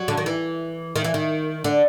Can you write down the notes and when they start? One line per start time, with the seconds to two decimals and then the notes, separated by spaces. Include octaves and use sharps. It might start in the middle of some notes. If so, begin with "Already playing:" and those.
Already playing: F#3
0.08 D3
0.17 D#3
0.26 E3
0.96 D#3
1.04 E3
1.14 D#3
1.64 D3